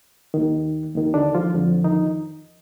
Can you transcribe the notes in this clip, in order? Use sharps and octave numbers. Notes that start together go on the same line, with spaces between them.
D#2 D#3
D#2 D#3
D3 D4
F3 F4
F2 D3 F3
D#3 D#4